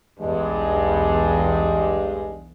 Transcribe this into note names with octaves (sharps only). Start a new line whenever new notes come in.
B1 E2 G2 G#3